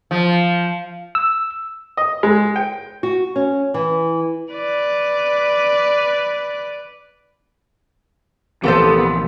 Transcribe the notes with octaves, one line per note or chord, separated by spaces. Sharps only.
F3
E6
D#5
G#3
G5
F#4
C#4
E3
B4 D5
A#1 C3 E3 A#3 B3 G4 A4 C5